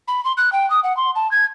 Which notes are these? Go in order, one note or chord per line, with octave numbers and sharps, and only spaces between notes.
B5
C6
F#6
G5
D#6
F#5
C6
A5
G#6